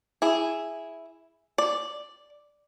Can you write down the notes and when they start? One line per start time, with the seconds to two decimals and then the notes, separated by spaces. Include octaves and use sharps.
0.22 E4 G#4
1.58 D5